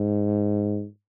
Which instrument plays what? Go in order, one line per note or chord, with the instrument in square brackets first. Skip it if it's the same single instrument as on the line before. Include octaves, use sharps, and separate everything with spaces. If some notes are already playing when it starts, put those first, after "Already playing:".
Already playing: [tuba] G#2